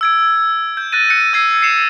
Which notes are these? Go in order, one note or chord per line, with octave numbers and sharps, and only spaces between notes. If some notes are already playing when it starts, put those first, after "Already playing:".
E6 G#6 D7
G6
F#6 A6 A#6 D#7
F#6 G6 C#7 D#7
E6 G#6 C7
C7 C#7 E7 F7